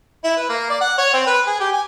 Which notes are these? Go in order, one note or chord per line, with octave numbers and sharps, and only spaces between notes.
E4
B4
A#3
D5
F#5
C#5
C4
B4
G#4
G4
G#5